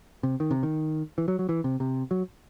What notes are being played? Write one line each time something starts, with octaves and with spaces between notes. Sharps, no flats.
C3
D#3
C3
D#3
E3
F#3
F#3
E3
C3
C3
F#3